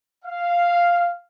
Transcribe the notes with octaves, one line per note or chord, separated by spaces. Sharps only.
F5